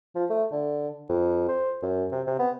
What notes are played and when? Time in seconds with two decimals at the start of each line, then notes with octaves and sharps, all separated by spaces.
0.15 F3
0.30 A3
0.52 D3
1.09 F2
1.48 C5
1.82 F#2
2.12 C3
2.27 C3
2.39 B3